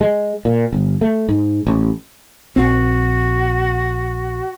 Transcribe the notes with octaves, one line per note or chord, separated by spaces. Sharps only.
G#3
A#2
G1
A3
G#2
A1
A#1 C4 F#4